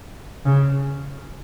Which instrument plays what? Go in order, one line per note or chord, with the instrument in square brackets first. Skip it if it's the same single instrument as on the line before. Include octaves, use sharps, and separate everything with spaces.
[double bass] C#3